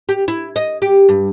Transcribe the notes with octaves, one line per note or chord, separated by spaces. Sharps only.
G4
E4
D#5
G4
G2